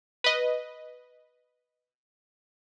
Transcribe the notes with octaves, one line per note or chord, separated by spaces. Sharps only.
B4 D#5